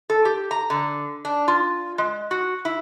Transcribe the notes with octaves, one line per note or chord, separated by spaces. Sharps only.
A4
G4
A#5
D3
D4
F4
G#3
F#4
E4